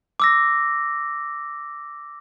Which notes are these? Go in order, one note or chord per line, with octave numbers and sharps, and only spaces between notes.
D6 E6 A#6